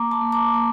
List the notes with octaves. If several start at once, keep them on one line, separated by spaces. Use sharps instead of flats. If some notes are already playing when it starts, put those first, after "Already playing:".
Already playing: A#3 A#5 D6
A5 C6
A#3
A#5 D6
A#3